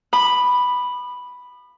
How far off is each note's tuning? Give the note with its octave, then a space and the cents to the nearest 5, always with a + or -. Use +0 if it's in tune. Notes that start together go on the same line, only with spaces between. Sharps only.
B5 +0 D#6 -45